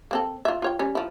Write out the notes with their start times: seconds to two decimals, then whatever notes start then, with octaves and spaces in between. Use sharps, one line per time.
0.11 A#3 C4 A4
0.45 F4 E5
0.62 F4 C#5 G5
0.79 G3 C#4
0.95 F3 E4